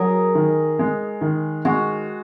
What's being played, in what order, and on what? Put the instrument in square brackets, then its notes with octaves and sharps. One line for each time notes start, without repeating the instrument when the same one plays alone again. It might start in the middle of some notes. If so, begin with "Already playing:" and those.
Already playing: [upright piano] F#3 [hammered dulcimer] G#4 A#4
[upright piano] D#3
G#3
D#3
[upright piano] G#3 [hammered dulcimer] F#4